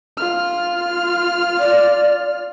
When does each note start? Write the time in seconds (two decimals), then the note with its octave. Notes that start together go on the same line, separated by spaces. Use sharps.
0.17 F4 F6
1.59 D5